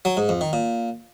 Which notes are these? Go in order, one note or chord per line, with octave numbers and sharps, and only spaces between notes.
F#3
G#2
F2
D#3
A#2